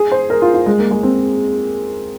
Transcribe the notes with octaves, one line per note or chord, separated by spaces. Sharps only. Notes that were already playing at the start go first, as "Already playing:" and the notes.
Already playing: G#4
C5
A#4
F4
F4
G#3
A#3
G#3
C4